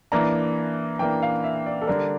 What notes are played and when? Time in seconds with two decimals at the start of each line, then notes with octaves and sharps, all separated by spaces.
0.12 E3 A#3 D4 A#5
0.99 E3 A#3 D4 G5
1.22 F5
1.44 E5
1.66 D5
1.82 A4
1.87 D3 G3 D4 A#4